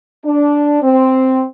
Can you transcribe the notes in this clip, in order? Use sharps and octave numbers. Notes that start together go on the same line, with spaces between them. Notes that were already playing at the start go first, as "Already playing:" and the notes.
D4
C4